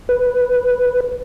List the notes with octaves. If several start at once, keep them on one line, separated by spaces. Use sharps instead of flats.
B4